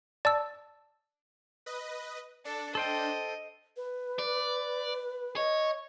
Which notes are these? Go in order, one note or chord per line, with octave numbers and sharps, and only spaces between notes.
D5 A5 E6
B4 D#5
D4 A4
A4 C5 D#5 G5
B4
D5
C#5 D#5